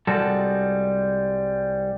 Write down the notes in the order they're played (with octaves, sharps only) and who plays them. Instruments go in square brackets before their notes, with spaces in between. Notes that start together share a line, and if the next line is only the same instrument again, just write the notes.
[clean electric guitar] C2 G3 G#3 F#4 A4